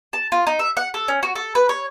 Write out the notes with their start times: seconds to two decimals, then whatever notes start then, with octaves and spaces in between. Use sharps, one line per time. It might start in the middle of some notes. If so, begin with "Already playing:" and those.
0.13 A5
0.32 F4
0.47 D#4
0.59 E5
0.77 F#5
0.94 A4
1.08 C#4
1.23 F#4
1.35 A4
1.55 B4
1.69 C#5